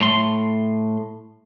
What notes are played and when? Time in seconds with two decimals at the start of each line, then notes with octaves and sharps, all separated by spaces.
0.01 A2 A3 C6